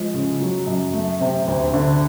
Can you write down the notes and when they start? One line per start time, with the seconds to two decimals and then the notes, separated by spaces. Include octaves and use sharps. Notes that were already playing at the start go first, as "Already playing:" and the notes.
Already playing: F3 G#3
0.14 C#3
0.40 F#3
0.67 F#2
0.94 A3
1.21 C3
1.47 D2
1.74 D3